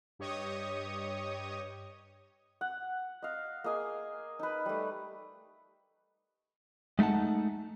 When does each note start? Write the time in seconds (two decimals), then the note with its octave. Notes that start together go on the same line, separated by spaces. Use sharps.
0.19 G2 G4 C#5 D#5 C#6 D#6
2.61 F#5
3.22 D#5 F5
3.64 A#3 G#4 D#5 G#5
4.39 D#4 B4
4.66 G3 A3
6.99 G#3 A3 D#4 F#5 A5